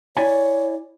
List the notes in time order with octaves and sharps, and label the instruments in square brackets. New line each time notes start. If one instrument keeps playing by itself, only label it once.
[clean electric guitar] E4 D5 G#5 [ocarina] C#5